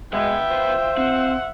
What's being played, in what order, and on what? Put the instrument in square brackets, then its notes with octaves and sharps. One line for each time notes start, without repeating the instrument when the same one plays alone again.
[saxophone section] B2 G#3 [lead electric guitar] B4 F#5 [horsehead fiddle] E5 [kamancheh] G5
[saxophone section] F4 C5
[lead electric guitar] C4 [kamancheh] F#5